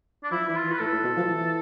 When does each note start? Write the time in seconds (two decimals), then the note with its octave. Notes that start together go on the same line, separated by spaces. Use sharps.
0.24 D4
0.31 F3 E4
0.48 E3 E4
0.56 F4
0.64 E3
0.72 B4
0.79 A2 A4
0.92 A2
1.04 B2
1.16 F3
1.28 E3